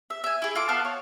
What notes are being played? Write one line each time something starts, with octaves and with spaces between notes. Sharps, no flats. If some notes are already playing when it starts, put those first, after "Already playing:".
E5
E5 G#5
E4 G#4
F4 A4 D6
B3 F5 A5 F6
C#5